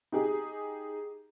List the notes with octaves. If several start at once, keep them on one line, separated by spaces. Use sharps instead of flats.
D#4 G4 G#4